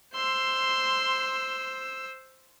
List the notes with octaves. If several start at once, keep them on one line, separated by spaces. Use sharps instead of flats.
C5 C6 E6